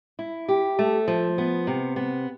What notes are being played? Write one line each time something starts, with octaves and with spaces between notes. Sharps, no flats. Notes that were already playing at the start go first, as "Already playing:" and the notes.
E4
G4
A3
F3
B3
C3
B3